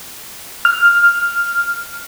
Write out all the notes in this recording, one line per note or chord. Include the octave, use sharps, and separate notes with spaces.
F6